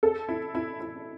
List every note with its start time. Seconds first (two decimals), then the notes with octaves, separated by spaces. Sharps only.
0.03 A4
0.29 E4
0.55 E4
0.80 E4